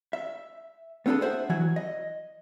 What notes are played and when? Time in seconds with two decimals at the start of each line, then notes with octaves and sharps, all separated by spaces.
0.13 E5
1.06 B3 C4 D4 F4 G#4 A4
1.21 G#4 C5 E5 F#5
1.49 E3 F#3 F#4 G#5
1.76 D#5